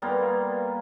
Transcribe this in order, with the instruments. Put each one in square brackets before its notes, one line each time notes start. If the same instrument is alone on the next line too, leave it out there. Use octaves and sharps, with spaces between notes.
[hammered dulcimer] G3 A#3 B3 F4